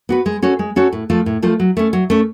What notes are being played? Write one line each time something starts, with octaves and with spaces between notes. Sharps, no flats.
B3 F#4 B4
G#3
C#4 F#4 A4 C#5
G#3
C#4 F#4 A4 C#5
A2
F3 A3 F4 A4
A2
F3 A3 F4 A4
F#3
A3 C#4
F#3
A3 C#4